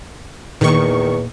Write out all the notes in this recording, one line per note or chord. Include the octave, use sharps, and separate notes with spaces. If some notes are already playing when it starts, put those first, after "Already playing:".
E2 A#2 D#3 A#3 C#6